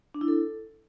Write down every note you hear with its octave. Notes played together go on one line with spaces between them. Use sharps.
D4
E4
A4